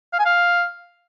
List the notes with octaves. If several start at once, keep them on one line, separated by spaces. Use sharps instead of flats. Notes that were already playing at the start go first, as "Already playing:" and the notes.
F5
G#5
F5